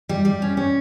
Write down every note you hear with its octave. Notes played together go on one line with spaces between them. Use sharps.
G3
G3
C#4
C#4